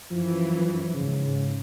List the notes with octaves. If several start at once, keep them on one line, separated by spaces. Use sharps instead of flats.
F#2 E3 F3 E4
G#2 C#3